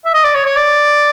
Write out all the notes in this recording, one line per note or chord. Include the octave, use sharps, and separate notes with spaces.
E5
D#5
D5
C#5
C#5
D5